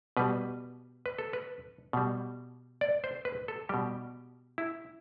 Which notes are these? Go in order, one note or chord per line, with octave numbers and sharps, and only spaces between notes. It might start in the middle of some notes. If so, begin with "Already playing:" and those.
B2 G3 B4
B4
A4
B4
B2 G3
D5
C5
B4
A4
B2 G3 G4
E4